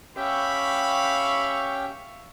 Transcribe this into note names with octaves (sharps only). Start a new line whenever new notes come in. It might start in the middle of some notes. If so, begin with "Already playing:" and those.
C#4 G4 E5 F5 G5 B5 C#6